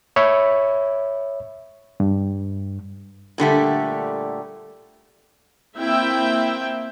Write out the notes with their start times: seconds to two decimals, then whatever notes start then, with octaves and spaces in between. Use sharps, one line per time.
0.16 C#5 E5 B5
2.00 G2
3.38 A#2 D3 G3 A3
5.75 A#3 C4 E4 E5 G5